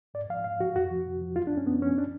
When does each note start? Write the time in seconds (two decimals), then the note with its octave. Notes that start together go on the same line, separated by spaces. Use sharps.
0.14 G#2 D5
0.30 F3 F5
0.44 G#2 F5
0.60 F3 F#4
0.75 F2 F#4
0.91 F3
1.06 F2
1.21 F3
1.36 F#2 F4
1.47 D4
1.52 F3
1.57 C#4
1.66 F#2 B3
1.82 F3 C#4
1.98 D4